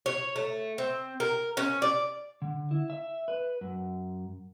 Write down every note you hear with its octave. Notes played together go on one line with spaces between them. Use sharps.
C#5
A3
C4
A#4
C#4
D5
D3
E4
E5
B4
F#2